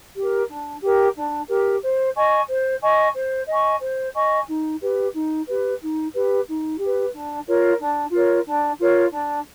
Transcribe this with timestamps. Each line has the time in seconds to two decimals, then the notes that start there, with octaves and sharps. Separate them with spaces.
0.15 G4 A#4
0.49 D4
0.81 G4 A#4
1.16 D4
1.48 G4 A#4
1.81 C5
2.15 D#5 G#5 C#6
2.48 C5
2.82 D#5 G#5 C#6
3.14 C5
3.48 D#5 G#5 C#6
3.81 C5
4.13 D#5 G#5 C#6
4.48 D#4
4.80 G4 B4
5.14 D#4
5.47 G4 B4
5.80 D#4
6.13 G4 B4
6.47 D#4
6.79 G4
6.84 B4
7.13 D4
7.46 F4 A#4 C#5
7.79 D4
8.12 F4 A#4 C#5
8.45 D4
8.79 F4 A#4 C#5
9.11 D4